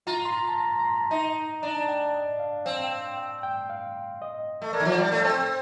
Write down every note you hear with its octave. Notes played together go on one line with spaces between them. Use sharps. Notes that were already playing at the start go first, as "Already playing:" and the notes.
F4 A#5
C6
A#5
A5
A#5
A#5
C6
A5
D#4 A#5
D4 A#5
A5
G5
D#5
F5
C4 F5
G5
G5
G5
F5
D#5
A3
A#3 D5
D#3
F3
G3 D5
A3
C4 C5